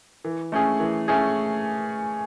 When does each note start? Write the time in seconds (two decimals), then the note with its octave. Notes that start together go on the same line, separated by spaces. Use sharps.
0.25 E3
0.52 A3 C#4 G#4
0.80 E3
1.08 A3 C#4 G#4